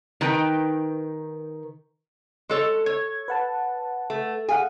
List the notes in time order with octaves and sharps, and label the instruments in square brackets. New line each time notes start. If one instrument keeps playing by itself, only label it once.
[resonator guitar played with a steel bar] D#3 D#4 B4 G5
G#3 A4 C#5
[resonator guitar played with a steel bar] C#5 [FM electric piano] G#6
[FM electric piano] B4 F#5 A5
[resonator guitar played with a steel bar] A3
[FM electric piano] G#4 F5 F#5 [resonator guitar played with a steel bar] G#5